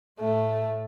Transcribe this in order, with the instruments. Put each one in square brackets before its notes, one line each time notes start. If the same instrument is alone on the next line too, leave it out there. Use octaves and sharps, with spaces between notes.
[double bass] A2 [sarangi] A3